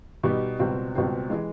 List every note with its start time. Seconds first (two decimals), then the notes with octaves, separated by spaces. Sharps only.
0.24 B2 G3 B3 D#4 G4
0.59 C#2 B2 G3 C4
0.95 C#2 B2 G3 C4
1.30 E3 G#3